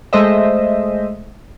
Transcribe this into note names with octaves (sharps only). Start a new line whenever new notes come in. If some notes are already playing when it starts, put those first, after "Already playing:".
G#3 A3 C5 D#5 E5